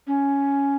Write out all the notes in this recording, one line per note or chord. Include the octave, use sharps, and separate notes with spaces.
C#4